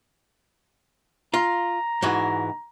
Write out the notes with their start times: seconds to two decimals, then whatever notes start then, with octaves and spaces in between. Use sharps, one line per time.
1.34 F4 A#5
2.02 G#2 E3 F#4